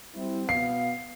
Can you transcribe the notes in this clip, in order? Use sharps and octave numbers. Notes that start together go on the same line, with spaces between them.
G3 C4 E4
B2 B3 F5 C7